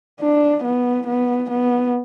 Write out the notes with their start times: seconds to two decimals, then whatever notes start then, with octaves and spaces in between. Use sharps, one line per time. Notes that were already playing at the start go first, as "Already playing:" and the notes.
0.21 D4
0.64 B3
1.07 B3
1.50 B3